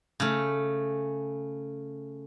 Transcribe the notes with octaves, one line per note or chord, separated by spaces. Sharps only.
C#3 A3